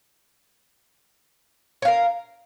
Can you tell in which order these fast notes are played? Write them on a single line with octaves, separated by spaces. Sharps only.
C#5 F5 A#4